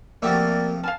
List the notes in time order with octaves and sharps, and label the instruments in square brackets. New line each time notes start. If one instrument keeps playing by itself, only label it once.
[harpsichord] C3 F3 A3 [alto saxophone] A#3 [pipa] F#4 G4 E5 [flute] D5
[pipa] F5 G#5 A5 [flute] F6